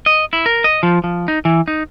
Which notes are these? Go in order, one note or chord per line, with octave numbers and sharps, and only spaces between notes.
D#5
E4
A#4
D#5
F3
F3
D#4
E3
D#4